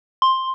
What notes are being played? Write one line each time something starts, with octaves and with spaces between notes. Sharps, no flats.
C6